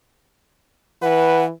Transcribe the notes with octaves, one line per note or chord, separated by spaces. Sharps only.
E3 B4 F#5